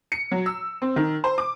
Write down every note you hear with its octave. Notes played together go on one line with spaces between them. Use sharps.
C#7
F#3
E6
C4
D#3
C5
D6